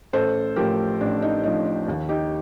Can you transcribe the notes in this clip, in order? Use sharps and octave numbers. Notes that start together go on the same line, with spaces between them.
A1 A4 C5
A2 F3 G4 A#4
A1 D4
D#4
A2 F3 D#4
D#4
D#2
D#4 G4